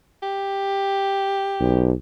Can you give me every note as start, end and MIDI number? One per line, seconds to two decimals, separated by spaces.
0.23 1.97 67
1.60 1.92 35